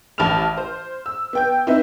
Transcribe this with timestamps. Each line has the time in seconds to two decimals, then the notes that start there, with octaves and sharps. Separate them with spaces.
0.18 A1 A5 B5 F6 F7
0.57 C5
1.06 E6
1.33 B3 G5 G6
1.67 C4 D#4 E4 B4 E5